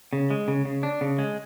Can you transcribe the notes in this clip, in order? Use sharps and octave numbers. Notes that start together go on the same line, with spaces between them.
C#3
G#3
C#3
C#3
D4
C#3
G#3